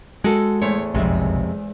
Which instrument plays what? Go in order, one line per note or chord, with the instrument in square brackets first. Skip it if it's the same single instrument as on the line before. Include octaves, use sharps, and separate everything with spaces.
[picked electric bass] G#3 [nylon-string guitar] F#4 A4
[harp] E2 A2 C5 [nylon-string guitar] C#5
[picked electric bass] F#1 B1 [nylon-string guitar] F2 C3 [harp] G#3